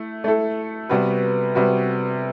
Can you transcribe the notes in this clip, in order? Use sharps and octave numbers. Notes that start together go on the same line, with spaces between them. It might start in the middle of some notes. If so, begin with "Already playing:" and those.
Already playing: A3 E4
A3 E4 A4
C3 G3 B3 F#4 B4
C3 G3 B3 F#4 B4